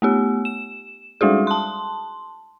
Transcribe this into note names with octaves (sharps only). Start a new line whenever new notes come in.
A3 B3 G4
E7
G3 G#3 D#4 F#4 G#4
A5 C6